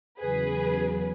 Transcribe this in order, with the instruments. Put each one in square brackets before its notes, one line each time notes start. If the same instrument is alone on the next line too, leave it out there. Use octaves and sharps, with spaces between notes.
[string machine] E2 C#3 F#3 [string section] G#4 B4